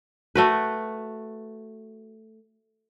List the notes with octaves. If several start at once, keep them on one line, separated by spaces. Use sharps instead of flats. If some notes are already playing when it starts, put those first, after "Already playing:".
A3 F#4 B4